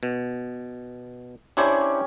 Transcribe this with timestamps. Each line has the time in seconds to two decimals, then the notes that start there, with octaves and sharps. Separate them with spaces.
0.03 B2
1.57 C#4 D4 E4 G4 C5 C#5